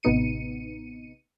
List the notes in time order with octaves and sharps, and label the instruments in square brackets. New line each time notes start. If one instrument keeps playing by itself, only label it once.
[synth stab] A1 C3 B3 D#4 C#7 D#7